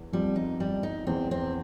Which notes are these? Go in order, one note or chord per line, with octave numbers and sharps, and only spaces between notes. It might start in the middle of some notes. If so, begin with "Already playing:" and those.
Already playing: E2 E3
F2 F3 G3
D#4
G3
D#4
E2 E3 C4
C4